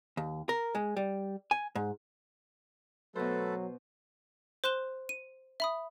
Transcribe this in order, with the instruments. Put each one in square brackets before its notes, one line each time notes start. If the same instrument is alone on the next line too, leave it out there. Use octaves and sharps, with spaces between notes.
[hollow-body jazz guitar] D#2
A#4
G#3
G3
G#5
G#2
[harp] B2 C5 [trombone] F#3 [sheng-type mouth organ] A3 A4 B4
[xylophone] C5 C6 F#6 E7 G7
D#7
E5 B5 D#6